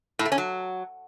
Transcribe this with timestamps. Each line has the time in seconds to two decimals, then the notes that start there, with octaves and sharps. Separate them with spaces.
0.19 A2
0.25 A3
0.32 C#4
0.38 F#3